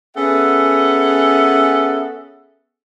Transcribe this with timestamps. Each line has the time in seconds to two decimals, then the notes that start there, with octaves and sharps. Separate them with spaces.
0.16 B3 C#4 G#4 A4 E5 F#5